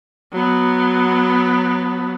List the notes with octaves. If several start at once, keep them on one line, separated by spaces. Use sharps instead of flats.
F#3 B3